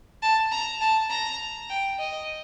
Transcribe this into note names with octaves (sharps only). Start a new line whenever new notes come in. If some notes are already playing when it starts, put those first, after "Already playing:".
A5
A#5
A5
A#5
G5
D#5